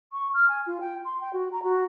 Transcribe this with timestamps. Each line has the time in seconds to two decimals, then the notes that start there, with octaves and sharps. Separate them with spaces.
0.12 C#6
0.34 F6
0.48 G#5
0.66 F4
0.80 G5
1.05 C6
1.21 G5
1.33 F#4
1.52 A#5
1.63 F#4